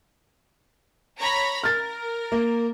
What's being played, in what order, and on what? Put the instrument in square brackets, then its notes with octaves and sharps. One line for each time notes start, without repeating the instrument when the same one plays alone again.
[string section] C#5 A#5 B5
[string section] A#4 [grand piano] F6 A6
[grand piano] A#3